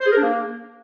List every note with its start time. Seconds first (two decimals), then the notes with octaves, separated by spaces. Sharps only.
0.01 C5
0.06 G#4
0.12 A#4
0.17 D4
0.22 A#3